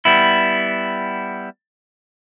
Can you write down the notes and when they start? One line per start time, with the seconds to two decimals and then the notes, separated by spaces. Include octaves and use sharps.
0.05 G3 B3 E4